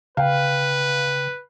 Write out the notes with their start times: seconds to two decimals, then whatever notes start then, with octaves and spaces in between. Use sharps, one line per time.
0.17 C#3 B4 F5 G5